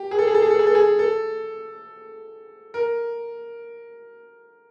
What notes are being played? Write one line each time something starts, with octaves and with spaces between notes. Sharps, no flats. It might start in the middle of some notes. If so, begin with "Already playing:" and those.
Already playing: G4
G#4
A4
G#4
A4
G#4
A4
G#4
A4
G#4
A4
A#4